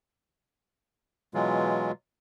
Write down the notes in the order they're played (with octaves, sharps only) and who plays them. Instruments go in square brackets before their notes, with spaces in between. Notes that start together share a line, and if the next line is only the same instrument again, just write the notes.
[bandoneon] B2 E3 F#3 G#3 F4